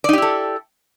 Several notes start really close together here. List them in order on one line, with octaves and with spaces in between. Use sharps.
D5 D#4 G4 E4 A4